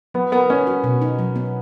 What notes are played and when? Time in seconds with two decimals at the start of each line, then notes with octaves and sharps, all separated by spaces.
0.14 F#3 B3
0.32 B3 A#4
0.50 B3 C#4
0.67 F#4
0.84 B2
1.02 D#4
1.19 F#3
1.36 B3